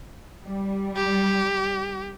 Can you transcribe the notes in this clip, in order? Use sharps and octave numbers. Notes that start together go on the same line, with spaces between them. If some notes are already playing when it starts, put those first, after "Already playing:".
G3
G4